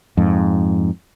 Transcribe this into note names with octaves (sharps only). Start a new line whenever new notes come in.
F2 G#2